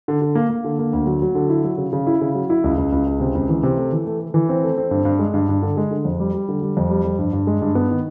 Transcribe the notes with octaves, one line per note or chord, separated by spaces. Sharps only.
D3
D3
A#3
A#3
D3
A#3
D2
F#3
F#3
D3
E4
F#3
C#3
C#3
E4
C#3
F#3
E4
C#2
C#2
C#2
C#2
C3
C#2
E3
C3
A3
E3
A3
A3
E3
C4
A3
C4
G2
G2
G#3
G2
G2
D3
G#3
D3
F2
G3
G3
D3
G3
F2
G3
F2
G2
G2
G#3
G2
B3
D#3